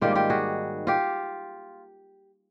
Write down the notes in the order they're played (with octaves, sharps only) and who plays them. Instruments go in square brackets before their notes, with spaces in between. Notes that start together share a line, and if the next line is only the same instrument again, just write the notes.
[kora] G#2 D#3 G3 A#3 F4 G4
F4 G4
F#4 G#4
F4 G4